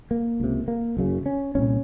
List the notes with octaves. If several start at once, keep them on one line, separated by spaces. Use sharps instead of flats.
A#3
C#2 C3
A#3
F#1 F#2 C#3
C#4
C2 A#2 C#4